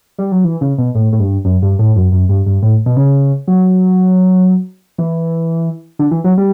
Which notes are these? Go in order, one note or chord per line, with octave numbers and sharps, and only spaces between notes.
G3
F#3
E3
C#3
B2
A2
A2
G2
F#2
G2
A2
F#2
F#2
G2
G2
A2
B2
C#3
F#3
E3
D3
E3
F#3
G3